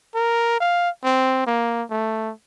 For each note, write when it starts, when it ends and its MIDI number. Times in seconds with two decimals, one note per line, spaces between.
0.15 0.59 70
0.61 0.89 77
1.04 1.42 60
1.47 1.84 58
1.90 2.32 57